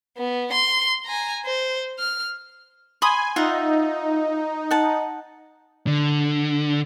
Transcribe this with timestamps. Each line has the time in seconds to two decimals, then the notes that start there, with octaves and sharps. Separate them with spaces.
0.17 B3
0.52 C6
1.05 G#5 A#5
1.45 C5
1.99 F6
3.02 G#5 B5 C6 D#6
3.36 D#4 F4 E5 F#5
4.71 F#5 A5
5.87 D3